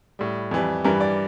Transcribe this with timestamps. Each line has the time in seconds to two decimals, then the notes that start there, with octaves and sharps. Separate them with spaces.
0.19 A2 G3
0.51 F2 E3 G3
0.84 G2 E3 G3 A#4
1.01 D5